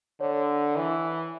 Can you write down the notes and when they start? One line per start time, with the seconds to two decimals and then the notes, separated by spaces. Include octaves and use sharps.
0.20 D3 C#5
0.76 E3